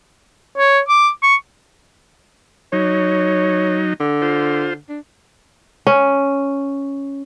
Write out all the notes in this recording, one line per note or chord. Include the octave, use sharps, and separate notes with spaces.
C#5
D6
C#6
F#3 D#4 C#5
D3
F4 C5
D4
C#4